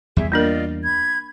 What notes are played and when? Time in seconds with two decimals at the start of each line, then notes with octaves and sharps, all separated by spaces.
0.16 E2 G3 G#4 E5
0.32 A#3 D4 F4 A#4 D5 D#5
0.84 B5 G#6